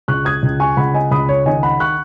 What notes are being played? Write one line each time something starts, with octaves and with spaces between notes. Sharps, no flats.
C#2 C#6 F#6
D#6 G#6
C#2
G#5 C#6
C#2 F#5 B5
D#5 G#5
C#2 B5 D#6
C#5
D#3 D#5 G#5
F#5 B5
C#6 F#6